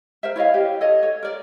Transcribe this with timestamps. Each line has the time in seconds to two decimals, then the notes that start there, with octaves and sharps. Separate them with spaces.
0.23 A#4 C5 E5
0.36 E4 C#5 D#5 F5
0.54 G4
0.81 A4 C#5 D#5
1.03 C#5
1.23 A#4 D5